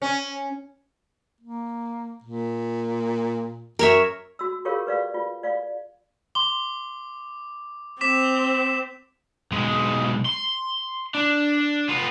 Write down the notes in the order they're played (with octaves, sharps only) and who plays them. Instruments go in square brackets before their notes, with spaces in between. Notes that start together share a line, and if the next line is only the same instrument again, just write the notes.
[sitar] C#4
[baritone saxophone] A#3
A#2
[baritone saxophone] F#2 [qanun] A#4 C#5 E5
[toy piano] F#4 E6
F4 G4 G#4 A#4 C#5 F5
B4 D5 F5
F4
D5 F5
[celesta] C6 G7 [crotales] D6
[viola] C4 [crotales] D6 B6 E7
[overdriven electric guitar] B1 G#3
C6
D4
B3 F4